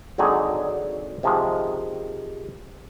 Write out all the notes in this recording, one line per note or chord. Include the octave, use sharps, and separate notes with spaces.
G#1 D3 F#3 C4 D#4 G#4
C3 D#3 F3 G#3